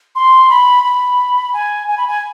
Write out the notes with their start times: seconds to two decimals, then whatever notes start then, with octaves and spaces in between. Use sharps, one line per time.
0.15 C6
0.50 B5
0.84 B5
1.53 G#5
1.88 G#5
1.98 B5
2.08 G#5